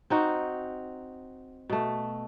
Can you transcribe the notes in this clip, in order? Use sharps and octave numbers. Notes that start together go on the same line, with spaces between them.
C4 D#4 F#4
B2 A3